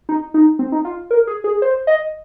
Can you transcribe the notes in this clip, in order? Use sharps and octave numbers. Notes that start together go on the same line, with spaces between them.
D#4
D#4
C4
D#4
F4
A#4
G#4
G#4
C5
D#5